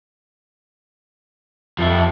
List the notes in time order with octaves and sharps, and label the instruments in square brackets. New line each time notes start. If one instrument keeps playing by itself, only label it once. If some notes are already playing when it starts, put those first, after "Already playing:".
[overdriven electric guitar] F2 [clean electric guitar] F4 A4 E5